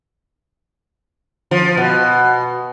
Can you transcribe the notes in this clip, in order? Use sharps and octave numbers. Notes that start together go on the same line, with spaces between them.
F3
B2